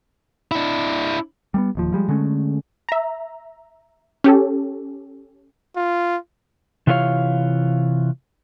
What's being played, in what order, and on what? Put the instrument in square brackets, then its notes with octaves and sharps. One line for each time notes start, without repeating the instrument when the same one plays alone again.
[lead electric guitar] D4 E4
[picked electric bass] G3 A3 B3
D1 D#2 F3
F3 G3 G#3
D3 G#3 A3 C#4
[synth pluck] E5 A#5
C#4 G4 A4
[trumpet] F4
[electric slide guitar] C3 E3 F4 G4 C#5 F5